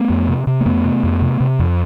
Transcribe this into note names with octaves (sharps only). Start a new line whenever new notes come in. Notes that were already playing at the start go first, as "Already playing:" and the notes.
Already playing: A3 B3
F2
C3
C3
A#3
F2 A3 B3
C3
F2
C3
C3
F2